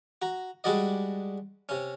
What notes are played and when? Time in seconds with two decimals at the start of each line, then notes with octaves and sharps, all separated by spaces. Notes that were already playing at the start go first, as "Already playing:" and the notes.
0.22 F#4 A#5
0.64 G3 G#3 D4 F#4 D5 D#5
1.69 C3 C#4